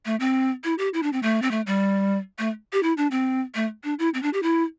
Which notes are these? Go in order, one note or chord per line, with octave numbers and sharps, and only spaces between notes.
A3
C4
E4
G4
E4
D4
C4
A3
C4
A3
G3
A3
G4
E4
D4
C4
A3
D4
E4
C4
D4
G4
E4